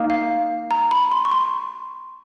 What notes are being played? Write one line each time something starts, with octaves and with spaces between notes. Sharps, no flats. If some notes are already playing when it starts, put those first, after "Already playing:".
Already playing: A#3 D#4
F5
A#5
B5
C6
C#6
C6